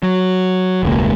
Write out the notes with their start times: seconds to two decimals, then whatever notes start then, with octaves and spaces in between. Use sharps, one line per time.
0.03 F#3
0.83 E1 C#2 A#3